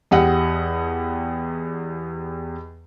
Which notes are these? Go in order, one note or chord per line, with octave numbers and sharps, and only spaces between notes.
E2 G4 D#5 F#5